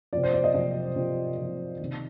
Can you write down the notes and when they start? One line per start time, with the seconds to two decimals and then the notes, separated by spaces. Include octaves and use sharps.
0.13 C3 F3 D5
0.23 C5
0.34 D5
0.44 D#5
0.54 C3 F3 D#5
0.96 C3 F3
1.38 C3 F3
1.80 C3 D#3